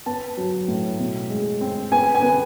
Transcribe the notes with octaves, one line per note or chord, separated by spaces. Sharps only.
B3 A5
F#3
A2
B2
G#3
C4
B3 G#5
G#5
B3